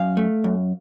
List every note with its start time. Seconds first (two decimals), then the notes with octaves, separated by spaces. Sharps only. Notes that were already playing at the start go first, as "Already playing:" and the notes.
Already playing: F#2 F5
0.17 A3
0.44 F#2